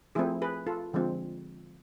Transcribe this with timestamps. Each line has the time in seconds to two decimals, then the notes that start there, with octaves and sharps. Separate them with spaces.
0.15 F3 A3 C4 E4 G#4
0.42 G#4 B4
0.67 F4 A4
0.93 D3 F3 G#3 C4